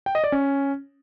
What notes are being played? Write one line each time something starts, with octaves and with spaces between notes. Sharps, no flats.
G5
D#5
D5
C#4